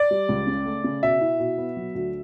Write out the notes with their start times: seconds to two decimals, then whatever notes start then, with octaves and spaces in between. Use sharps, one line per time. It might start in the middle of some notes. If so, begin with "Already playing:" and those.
Already playing: D5
0.11 G3
0.29 C#2
0.47 C#3
0.66 A3
0.84 C#3
1.02 B2 E5
1.21 E4
1.39 B2
1.58 B3
1.77 F#3
1.95 D2